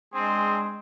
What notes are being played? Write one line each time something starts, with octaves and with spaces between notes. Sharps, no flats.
G#3 C4 D4 G#4 C6